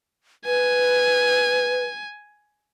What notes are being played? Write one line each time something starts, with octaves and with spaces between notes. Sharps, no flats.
B4 G#5